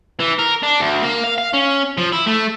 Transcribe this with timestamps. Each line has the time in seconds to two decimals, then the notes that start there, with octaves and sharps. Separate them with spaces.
0.20 E3
0.39 A#4
0.63 D4
0.81 D2
1.02 A#3
1.24 F5
1.38 F5
1.53 C#4
1.98 F3
2.13 E4
2.27 A3